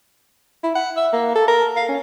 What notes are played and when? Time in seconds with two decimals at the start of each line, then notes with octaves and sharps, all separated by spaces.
0.63 E4
0.75 F#5
0.97 E5
1.13 A#3
1.36 A4
1.48 A#4
1.76 F5
1.89 C#4